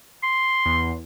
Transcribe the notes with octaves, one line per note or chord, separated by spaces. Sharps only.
C6
E2